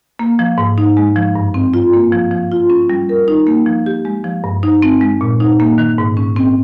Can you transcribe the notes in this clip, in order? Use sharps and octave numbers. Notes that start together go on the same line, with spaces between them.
A#3
F3
G#2
D#4
G#3
F3
G2
C4
F4
A#3
F3
F3
F4
C#4
G3
A#4
D#4
A#3
F3
G4
G#3
F3
G2
D#4
C4
G#3
A#2
D#4
A#3
D#3
G#2
C#4
C4